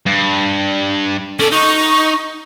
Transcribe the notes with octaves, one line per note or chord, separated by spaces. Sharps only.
G2
C#4 A4 D5
D#4 C#6